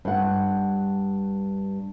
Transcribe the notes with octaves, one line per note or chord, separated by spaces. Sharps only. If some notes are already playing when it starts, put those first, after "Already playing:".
G2 F#5